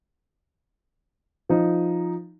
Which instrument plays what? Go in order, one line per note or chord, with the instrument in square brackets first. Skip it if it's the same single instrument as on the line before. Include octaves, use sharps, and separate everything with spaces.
[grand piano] F3 D#4